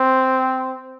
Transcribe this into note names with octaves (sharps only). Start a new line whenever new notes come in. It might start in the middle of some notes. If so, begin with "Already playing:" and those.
Already playing: C4